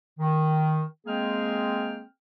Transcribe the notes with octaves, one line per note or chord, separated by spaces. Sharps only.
D#3
G#3 A#3 C4 G#4 G5 F6